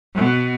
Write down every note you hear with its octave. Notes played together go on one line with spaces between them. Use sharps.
B2